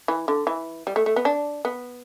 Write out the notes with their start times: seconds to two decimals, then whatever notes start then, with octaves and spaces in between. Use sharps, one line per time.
0.08 E3
0.28 D3
0.47 E3
0.87 G3
0.96 A3
1.06 A3
1.16 B3
1.25 D4
1.65 B3